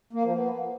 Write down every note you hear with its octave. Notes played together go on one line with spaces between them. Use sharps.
A#3
F3
B3